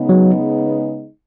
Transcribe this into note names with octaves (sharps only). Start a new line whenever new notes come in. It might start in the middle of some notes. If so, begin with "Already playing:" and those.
Already playing: C#3 G#3 B3 D#4
F#3